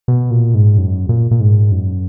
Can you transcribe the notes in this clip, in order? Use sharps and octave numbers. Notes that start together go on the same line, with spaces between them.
B2
A#2
G#2
F#2
A#2
A#2
G#2
F#2